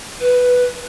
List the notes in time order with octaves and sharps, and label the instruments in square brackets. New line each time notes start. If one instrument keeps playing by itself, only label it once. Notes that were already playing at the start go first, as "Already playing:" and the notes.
[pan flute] B4